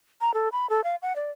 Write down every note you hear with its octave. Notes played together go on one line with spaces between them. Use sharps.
A#5
A4
B5
A4
F5
F#5
D5